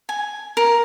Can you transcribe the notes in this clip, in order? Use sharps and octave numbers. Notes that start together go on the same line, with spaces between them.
G#5
A#4